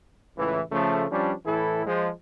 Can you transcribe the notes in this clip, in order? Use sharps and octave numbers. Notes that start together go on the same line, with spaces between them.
C#2 A2 E3
C#3 F3 A3
F3 G3 C#4 D4
A2 E3 E4 A4
F3 G#3